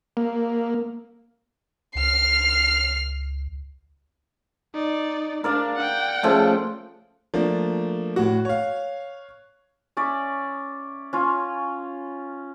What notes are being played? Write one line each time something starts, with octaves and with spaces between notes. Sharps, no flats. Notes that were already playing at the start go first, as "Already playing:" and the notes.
A#3
C#2 F6 C7
D#4 D5
D4 A#4 D5 F5
F#5 G5
C#3 F3 A3
F3 A3 A#3 D4
A2 F#4
C#5 F5
C#4 C#5 D5 E5
C#4 F4